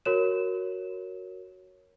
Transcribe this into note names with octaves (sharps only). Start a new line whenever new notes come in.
F#4 A#4 C#5 E7